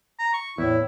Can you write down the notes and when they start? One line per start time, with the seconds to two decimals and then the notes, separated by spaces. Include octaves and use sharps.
0.19 A#5
0.34 C#6
0.58 E2 A2 E4